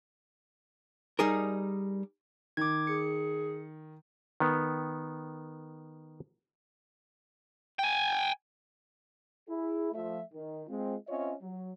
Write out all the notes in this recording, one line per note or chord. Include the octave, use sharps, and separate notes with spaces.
G3 D#4 G#4 A#4
D#3 D6 G#6
G#4 C#7
D#3 B3
G5 G#5
E4 G#4
F3 A3 E5
D#3
G#3 C4 F4
C4 C#4 F4 C#5 D#5 E5
F#3